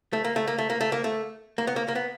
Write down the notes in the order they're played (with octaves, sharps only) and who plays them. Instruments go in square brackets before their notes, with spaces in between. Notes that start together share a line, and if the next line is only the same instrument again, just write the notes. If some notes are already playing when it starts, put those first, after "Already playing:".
[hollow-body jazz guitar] A3
A#3
A3
A#3
A3
A#3
A3
A#3
A3
A#3
B3
A#3
A#3
B3